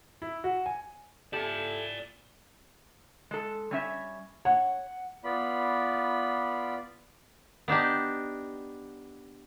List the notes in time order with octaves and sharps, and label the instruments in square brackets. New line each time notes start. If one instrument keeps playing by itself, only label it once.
[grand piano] E4
F#4
G#5
[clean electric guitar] E4 [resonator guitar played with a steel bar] G4 A4 [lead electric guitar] D5 G#5
[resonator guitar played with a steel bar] G#3 A4
G3 C#4 E5
[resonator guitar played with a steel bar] C#5 [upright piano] F#5
[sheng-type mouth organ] B3 F4 D5 B5
[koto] B3 D4 D#4 G4